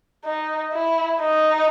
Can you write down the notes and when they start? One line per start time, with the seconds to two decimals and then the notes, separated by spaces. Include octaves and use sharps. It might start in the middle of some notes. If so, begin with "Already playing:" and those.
0.25 D#4
0.73 E4
1.20 D#4